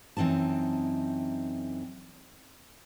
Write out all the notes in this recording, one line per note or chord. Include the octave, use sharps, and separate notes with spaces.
F#2 E3 C4 D#4 A5